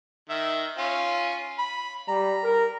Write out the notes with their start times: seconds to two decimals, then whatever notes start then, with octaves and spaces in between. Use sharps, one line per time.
0.30 D#3 E5
0.78 C#4 F4
1.58 B5
2.08 G3 A#5
2.44 A#4